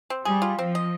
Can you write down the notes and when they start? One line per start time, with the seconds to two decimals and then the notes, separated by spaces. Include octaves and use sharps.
0.10 C4
0.25 G3 G#4
0.42 F4
0.59 F3 C4
0.75 D#5